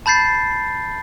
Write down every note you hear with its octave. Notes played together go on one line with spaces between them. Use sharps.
A5 B5 G6 A6 C7